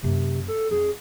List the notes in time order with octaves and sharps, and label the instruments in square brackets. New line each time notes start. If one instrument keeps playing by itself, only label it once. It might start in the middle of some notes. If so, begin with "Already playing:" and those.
[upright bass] F#2 A#3 [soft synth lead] C3
[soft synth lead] A4
[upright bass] F2 [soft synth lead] G#4